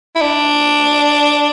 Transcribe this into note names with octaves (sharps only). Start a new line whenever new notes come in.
E4
D4